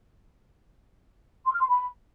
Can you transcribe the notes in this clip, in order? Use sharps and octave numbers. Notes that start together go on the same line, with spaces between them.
C6
F6
C6
B5